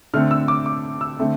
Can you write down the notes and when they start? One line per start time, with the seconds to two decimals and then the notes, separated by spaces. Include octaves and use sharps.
0.14 D3 A3 C4 F6
0.31 E6
0.48 D6
0.66 D6
1.01 E6
1.19 D3 A3 C4